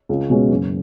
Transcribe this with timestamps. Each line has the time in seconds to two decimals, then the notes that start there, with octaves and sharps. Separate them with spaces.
0.09 C#2
0.30 B2 G#3 C#4
0.50 F#1